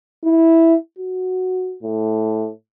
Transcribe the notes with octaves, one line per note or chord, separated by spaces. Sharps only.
E4
F#4
A2